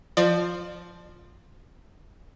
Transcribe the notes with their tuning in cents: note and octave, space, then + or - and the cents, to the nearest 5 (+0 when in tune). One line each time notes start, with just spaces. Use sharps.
F3 +0 D5 +40